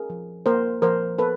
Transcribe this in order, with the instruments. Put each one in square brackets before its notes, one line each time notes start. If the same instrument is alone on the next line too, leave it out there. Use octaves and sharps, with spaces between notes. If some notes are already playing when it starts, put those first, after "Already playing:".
Already playing: [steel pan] C#4 G#4 A#4
F3
A#3 A#4 C5
F3 A#4 C5
B3 A4 B4